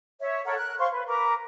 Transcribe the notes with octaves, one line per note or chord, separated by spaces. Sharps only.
C#5 E5
A4 A#4 C#5 F#5
A#4 F#6
C5 F5 C6 C#6
B4
A#4 B4 A#5 D6